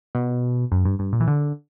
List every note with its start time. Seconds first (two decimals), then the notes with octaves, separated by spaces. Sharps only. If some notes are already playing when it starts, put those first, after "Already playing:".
0.15 B2
0.72 F#2
0.85 G2
0.99 G2
1.13 A#2
1.20 E3
1.27 D3